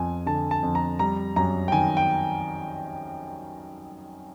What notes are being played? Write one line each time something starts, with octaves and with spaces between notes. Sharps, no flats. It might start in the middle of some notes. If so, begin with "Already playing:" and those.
Already playing: F2 F3 G#5
D3 A5
A5
F2
A#5
G3 A#5
F#2 A#5
G5
D#3 G#5
G5